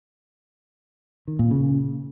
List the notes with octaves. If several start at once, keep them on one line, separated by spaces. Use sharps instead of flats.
D#3
A#2
C#3